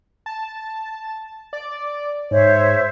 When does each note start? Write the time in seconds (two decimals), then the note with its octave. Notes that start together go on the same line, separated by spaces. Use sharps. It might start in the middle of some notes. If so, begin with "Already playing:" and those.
0.26 A5
1.53 D5
2.31 G#2 C5 C#5 E5